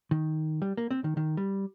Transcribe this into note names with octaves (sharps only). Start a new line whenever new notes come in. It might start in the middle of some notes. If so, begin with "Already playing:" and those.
D#3
G3
A#3
C4
D#3
D#3
G3